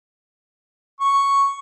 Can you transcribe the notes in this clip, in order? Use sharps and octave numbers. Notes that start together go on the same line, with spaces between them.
C#6